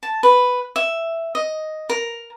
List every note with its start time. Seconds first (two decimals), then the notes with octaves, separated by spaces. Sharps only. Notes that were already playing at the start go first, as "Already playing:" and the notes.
0.03 A5
0.23 B4
0.76 E5
1.35 D#5
1.90 A#4